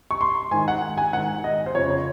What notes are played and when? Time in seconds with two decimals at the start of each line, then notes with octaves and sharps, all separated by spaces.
0.11 C#6
0.21 C6
0.51 G#2 D#3 G#5
0.68 F#5
0.98 G#5
1.13 G#2 D#3 F#5
1.44 D#5
1.66 C5
1.75 F2 C#5
1.79 C#3
1.90 C#5